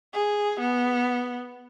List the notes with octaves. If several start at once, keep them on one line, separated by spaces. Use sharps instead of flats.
G#4
B3